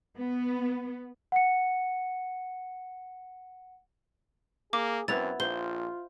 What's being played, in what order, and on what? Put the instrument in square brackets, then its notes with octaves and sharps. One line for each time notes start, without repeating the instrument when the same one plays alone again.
[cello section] B3
[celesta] F#5 C#7
[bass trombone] A#3 [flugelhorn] G#4 [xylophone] D6
[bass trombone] F#2 [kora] B3 E4 [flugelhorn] C4 [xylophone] A6 F7
[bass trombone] A#1 [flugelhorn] F4 [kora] C5 [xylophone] G7